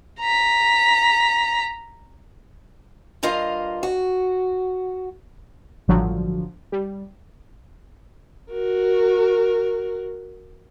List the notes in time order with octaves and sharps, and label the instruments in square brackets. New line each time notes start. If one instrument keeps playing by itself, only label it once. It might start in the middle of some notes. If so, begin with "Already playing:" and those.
[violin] A#5 B6
[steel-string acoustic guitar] G2 F4 A#4 D#5 F5
F#4
[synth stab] A1 G2 D3 F3 F#3
G3
[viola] F#4 A#4